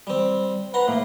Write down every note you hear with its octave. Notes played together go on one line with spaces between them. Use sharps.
G3 C4
B4 F#5 A#5 C6
A2 A#3